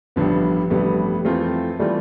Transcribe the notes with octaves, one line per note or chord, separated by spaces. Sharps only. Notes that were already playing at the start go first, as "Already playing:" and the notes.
A1 G2 D3 F3 G3 B3
A1 G2 D3 G3 A3 B3
F2 E3 A3 C4 F4
E3 G3 A3 C4 F4